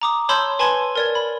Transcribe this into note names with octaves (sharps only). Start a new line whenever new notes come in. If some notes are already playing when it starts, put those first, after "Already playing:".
A#5 D6 D#6
C#5 A5 B5 C6 E6 G6
B4 G#5 A5 B5 C6 G#6
A#4 D5 G#6
B5